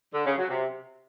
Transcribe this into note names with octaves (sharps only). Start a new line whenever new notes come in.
D3
C#3
F#3
C3